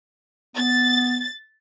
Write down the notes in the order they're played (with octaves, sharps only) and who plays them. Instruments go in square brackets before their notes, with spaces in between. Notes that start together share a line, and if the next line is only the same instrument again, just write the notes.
[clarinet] B3 [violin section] A6